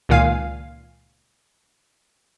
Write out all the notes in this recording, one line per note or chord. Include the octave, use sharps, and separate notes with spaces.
C#2 A#2 D#3 F5 G#5